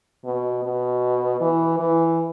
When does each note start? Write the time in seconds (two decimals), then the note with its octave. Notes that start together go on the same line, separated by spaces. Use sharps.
0.25 B2
0.64 B2
1.41 E3
1.80 E3